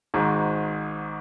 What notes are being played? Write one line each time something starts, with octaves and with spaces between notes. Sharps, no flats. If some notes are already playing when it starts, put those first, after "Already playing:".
G#1 G#2 D#3 G#3